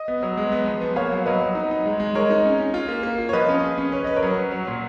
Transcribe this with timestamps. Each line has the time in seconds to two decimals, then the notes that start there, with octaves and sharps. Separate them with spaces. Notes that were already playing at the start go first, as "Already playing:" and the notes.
Already playing: D#5
0.08 B3
0.23 F#3
0.37 G#3
0.52 B3
0.67 F3
0.81 B3
0.96 A#3 C#5 F5
1.11 F#3
1.26 F#3 B4 D#5
1.41 F#3
1.55 D#4
1.71 D#4
1.86 G#3
2.00 G#3
2.15 G#3 A#4 C#5
2.30 D#4
2.45 C#4
2.60 C#4
2.74 F4
2.89 A#3
3.03 A#3
3.18 F4
3.29 C#5
3.33 F3 B4 D#5
3.49 C#4
3.64 G#4
3.78 C#4
3.92 B4 C#5
4.04 B4 D#5
4.16 A#4 C#5
4.23 F#3
4.37 B4
4.51 F#3
4.67 A#2